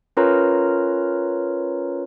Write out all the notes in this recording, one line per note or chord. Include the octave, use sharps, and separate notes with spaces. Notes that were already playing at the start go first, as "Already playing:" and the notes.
C#4 F4 A#4 B4 C#5 A#5